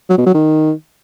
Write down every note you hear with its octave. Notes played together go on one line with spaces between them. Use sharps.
F#3
B2
F#3
D#3